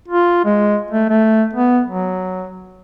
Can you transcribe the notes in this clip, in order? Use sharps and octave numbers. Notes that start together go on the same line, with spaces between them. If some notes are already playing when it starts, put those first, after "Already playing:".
F4
G#3
A3
A3
B3
F#3